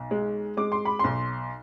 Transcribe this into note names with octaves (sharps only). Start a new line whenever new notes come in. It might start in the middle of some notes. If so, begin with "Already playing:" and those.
Already playing: B1
G#3
G#3 D6
C6
B5
B1 C6